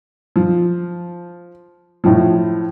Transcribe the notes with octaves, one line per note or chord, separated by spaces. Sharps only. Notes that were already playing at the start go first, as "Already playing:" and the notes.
F3
A2 F3